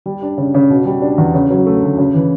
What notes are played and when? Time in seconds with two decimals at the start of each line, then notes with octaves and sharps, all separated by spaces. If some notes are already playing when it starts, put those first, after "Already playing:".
0.06 G3
0.22 D4
0.37 C#3
0.54 C#3
0.69 B2
0.85 G3
1.02 D4
1.18 E2
1.34 C#3
1.50 F#3
1.66 A3
1.82 D2
1.98 C#3
2.14 E3